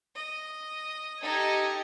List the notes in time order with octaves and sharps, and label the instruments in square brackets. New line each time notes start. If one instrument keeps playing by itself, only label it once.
[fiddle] D#5
[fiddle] D#4 A4 [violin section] G4 D#5 G#6